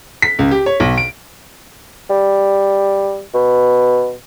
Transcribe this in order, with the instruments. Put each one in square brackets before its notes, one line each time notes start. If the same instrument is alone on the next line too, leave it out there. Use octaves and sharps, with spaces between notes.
[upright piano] B6
C#2
G4
C#5
B1
D7
[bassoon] G3
B2